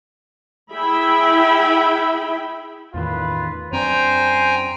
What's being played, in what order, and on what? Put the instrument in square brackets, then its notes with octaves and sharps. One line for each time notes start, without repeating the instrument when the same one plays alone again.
[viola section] E4 G#4 E5 G5 B5
[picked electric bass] E2 A2 D#3 [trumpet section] F4 B4
[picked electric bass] F#2 C4 D4 [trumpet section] C5 [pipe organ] G5 G#5 A#5